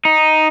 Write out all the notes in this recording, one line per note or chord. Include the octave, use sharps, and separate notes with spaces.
D#4